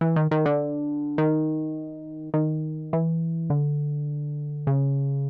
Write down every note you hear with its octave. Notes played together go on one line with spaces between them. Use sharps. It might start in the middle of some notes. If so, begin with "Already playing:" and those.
E3
D#3
D#3
D3
D#3
D#3
E3
D3
C#3